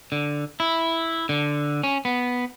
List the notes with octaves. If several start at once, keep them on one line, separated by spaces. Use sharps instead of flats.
D3
E4
D3
C#4
B3